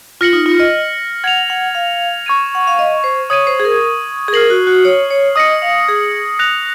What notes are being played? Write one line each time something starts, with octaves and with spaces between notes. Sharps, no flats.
F4 F6 A#6 C#7 F#7
D#4
F4
D#5
F#5 G#6 C#7 F7
F#5
F5
C#6 G#6 D#7
F#5
F5
D#5
C5
C#5 D#6 G#6 D#7
C5
G#4
A#4
G#4
A#4 F6 C7 F#7
F#4
F#4
C#5
C#5
D#5 D#6 A#6 C#7
F5
G#4
F#6 A#6 F7